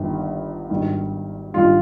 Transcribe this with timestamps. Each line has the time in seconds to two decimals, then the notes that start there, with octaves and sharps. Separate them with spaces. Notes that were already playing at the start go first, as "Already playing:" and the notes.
Already playing: G1 G2 D#3
0.70 G#1 G2 D#3
1.54 G#1 G2 D#3 F4